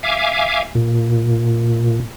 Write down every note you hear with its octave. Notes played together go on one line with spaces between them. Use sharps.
E5 F5 G#5 D6
A#2